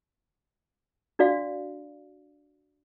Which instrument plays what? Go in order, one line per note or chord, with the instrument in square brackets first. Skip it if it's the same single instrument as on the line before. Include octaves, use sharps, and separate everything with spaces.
[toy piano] D4 F#4 D5 F5